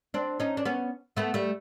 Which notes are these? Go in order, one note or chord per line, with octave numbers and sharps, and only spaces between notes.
C4 D4
C#4 D#4
D4
B3 C#4
A3 B3
G3 A3